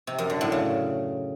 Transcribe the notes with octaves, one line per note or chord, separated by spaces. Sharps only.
C3
F#2
D3
A2
C#3